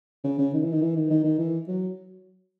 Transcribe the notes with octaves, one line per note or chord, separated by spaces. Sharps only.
C#3
C#3
D#3
E3
D#3
E3
D#3
D#3
D#3
E3
F#3